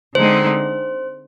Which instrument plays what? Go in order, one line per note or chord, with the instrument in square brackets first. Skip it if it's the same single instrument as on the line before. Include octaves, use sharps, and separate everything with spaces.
[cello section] D3 G#3 C4 D#4 [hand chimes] C5